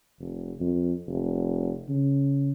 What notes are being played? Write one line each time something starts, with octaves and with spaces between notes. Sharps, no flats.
F1
F2
F1
C#3